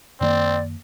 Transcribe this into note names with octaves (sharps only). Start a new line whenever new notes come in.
F#2 D#3 A#3 C4 D5